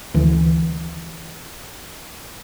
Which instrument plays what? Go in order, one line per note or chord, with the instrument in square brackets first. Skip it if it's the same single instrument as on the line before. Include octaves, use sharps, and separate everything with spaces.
[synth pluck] D2 D3 E3